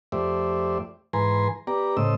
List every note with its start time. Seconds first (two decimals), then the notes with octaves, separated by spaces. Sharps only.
0.12 F2 A3 G4 C5 D5 E5
1.13 G#2 E3 B4 G#5 A#5 C6
1.67 B3 G4 D5 A#5
1.97 A2 C#3 A3 C5 D#5 E6